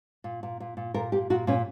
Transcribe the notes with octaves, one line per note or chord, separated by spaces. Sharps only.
A#2
A#2
A#2
A#2
A#2 A#4
A#2 G4
A#2 F#4
A#2 C#4